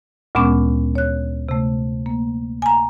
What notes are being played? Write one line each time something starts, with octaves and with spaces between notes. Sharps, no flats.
D2 A#2 G#3 B3 C#4 D6
C#5 F#6
C3 A3
A#3
G#5 A#5